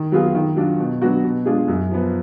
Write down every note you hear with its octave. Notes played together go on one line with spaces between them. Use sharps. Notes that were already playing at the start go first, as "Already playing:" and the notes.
Already playing: D#3
F#3 B3 F4 G#4
D#3
F#3 D4 F4
B2
F#3 B3 D4 F#4
B2
G#3 D4 F4 G#4
F#2
F3 B3